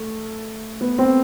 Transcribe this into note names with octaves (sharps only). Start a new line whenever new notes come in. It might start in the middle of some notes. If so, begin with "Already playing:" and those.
Already playing: A3
B3
C4